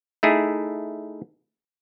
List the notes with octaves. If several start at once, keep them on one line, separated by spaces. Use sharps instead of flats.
A3 D#4 E4 G#4